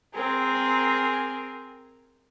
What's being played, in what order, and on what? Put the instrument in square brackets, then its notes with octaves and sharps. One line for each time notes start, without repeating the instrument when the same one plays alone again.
[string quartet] C4 G#4 A#4